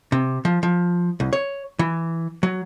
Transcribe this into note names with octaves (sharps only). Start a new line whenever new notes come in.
C3
F3
F3
C2
C#5
E3
F#3